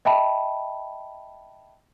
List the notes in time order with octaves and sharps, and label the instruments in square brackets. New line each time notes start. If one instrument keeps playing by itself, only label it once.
[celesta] D#5 E5 G5 A5 B5